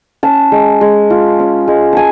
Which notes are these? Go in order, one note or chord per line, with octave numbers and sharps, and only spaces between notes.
C#4 A5
G#3
G#3
F4
C#4
G#3
G#5 A5